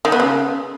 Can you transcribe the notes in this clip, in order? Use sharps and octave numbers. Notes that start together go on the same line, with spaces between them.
D#3
B3
C#3